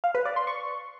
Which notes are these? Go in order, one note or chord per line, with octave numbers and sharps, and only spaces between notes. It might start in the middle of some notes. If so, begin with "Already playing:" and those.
F5
B4
D5
C6
C#6